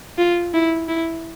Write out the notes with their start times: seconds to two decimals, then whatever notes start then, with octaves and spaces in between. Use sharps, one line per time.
0.18 F4
0.54 E4
0.88 E4